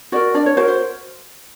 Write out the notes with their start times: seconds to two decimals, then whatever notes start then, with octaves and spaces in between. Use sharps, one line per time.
0.12 F#4 A#4 D5
0.34 D4 D5
0.46 C#5
0.57 F#4 A#4 C5
0.68 C5